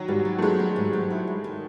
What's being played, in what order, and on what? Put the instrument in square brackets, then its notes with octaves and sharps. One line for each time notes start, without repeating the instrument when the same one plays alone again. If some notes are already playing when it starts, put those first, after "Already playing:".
Already playing: [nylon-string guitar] D#3 [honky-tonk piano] F#3
[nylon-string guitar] G#2 [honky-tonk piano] G3
[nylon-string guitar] F#3
[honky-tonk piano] A3
[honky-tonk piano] G#3 [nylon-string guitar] B3
[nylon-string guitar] D#3
G#2
F#3
E4
G#3
D#3